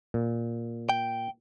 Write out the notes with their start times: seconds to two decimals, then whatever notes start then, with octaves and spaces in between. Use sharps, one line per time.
0.14 A#2
0.89 G5